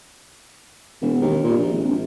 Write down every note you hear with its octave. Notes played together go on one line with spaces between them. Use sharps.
E1
D#2
A#2
A#1
G#1
A#1